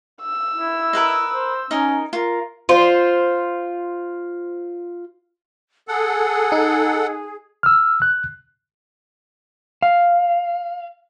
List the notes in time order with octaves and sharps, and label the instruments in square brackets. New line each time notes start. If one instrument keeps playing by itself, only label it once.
[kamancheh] E6
[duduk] E4
[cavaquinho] A#4 B4 D#5
[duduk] C5
[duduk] C#4 [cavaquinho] D#4 A#4 D#5
[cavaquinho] F4 [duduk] A#4
[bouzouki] F4 C5
[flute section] G#4 [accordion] A4 F#5
[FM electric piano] D#4
[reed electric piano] E6 F6
F#6
[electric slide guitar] F5